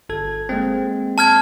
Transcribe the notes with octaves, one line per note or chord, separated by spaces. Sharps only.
G1 A4 G#6
G#3 A#3 C4
A5 F6 G#6